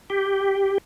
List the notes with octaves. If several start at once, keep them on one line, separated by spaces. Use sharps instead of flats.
G4